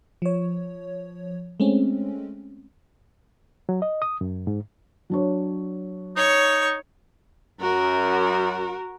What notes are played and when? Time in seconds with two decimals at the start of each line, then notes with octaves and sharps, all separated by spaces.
0.22 F3 C#5
1.60 G#3 A3 C4 C#4
3.69 F#3
3.82 D#5
4.02 D#6
4.21 F#2
4.47 G#2
5.10 F#3 D4 C#5
6.17 D#4 C#5 C#6
7.60 F#2 F#4 A#4